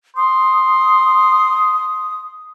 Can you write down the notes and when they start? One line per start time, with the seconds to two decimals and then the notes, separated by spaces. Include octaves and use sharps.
0.16 C6 D#6